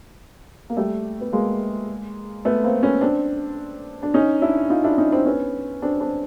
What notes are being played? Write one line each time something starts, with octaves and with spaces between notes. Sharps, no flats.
A#3
G3 A3
B3
G#3 A#3
A3 B3
A#3 C4
B3 C#4
C4 D4
D4
C#4 D#4
D4 E4
D#4 F4
D4 E4
C#4 D#4
C4 D4
B3 C#4
C4 D4
C4 D4